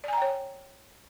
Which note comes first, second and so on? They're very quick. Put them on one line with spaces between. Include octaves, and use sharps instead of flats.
D5 G#5 A#5 G5 C#5